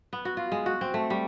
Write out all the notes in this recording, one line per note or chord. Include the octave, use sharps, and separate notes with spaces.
B3
F#4
F4
G#3
F#4
C4
A3
G3